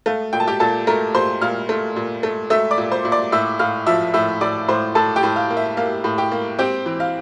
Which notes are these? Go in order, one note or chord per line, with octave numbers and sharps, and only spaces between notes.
A3 F5
A#2 G5
A5
G4 G5
A#2 A4 A5
A3 A#4 A#5
A#2 C5 C6
A#2 F5 F6
A3
A#2
A3
A3 E5 E6
D5 D6
A#2
C5 C6
A#2
D5 D6
A2 E5 E6
A2 F5 F6
F3 E5 E6
A2 E5 E6
A2 D5 D6
A2 C5 C6
A2 A4 A5
G4 G5
A2
F5
A#3
E5
A#3 F5
A2
G4 G5
A#3
C4 G4 G5
E3
F5